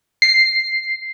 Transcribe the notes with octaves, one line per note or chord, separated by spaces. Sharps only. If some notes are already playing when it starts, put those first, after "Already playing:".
C7